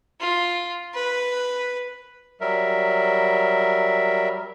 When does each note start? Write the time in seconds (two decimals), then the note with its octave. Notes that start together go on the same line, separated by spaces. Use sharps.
0.21 F4
0.95 B4
2.41 F#3 G3 A#4 E5